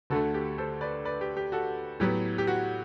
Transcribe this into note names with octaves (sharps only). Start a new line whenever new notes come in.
D2 D3 A3 F#4 A4
G4
A4 C5
B4 D5
B4 D5
G4
G4
F#4 A4
A2 F#3 B3 G4
G4
F#4